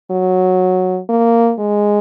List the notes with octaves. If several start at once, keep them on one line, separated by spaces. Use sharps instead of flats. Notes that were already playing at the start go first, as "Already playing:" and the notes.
F#3
A#3
G#3